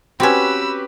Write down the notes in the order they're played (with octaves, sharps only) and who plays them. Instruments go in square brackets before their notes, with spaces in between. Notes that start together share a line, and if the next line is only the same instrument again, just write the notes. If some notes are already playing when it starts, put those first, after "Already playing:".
[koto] C4 C#4 [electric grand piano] F#4 G4 B4 [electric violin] B5 E6